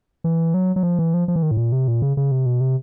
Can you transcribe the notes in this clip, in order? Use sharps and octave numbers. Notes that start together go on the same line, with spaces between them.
E3
F#3
F#3
F3
E3
F3
F3
E3
D#3
A2
A#2
C3
A#2
C#3
C#3
C3
B2
C3